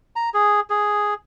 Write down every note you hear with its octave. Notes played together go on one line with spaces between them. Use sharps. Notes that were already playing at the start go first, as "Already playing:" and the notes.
A#5
G#4
G#4